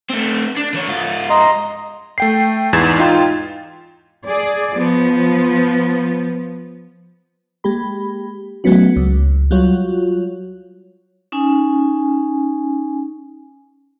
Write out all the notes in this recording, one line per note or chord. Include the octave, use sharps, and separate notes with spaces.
A3 C4
D4
E3 C#5
G#2 F4
D#5 A#5 C6
A3 G5 C7
E2 G#2 E3 G#6 A6 E7
D#4 F4 G5
G#4 D5
F3 B3
G#3 A#3 G4 B5
F#3 G#3 A3 B3 C#4 F#4
C#2
F#3 G3 F4 F#4 C#5
C#4 D#4 G#5